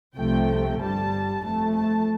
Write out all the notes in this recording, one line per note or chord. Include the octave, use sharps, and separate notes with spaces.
C2 C3 F3 A3 G5
G1 G2 G3 A5
F2 F3 A3 A5
A5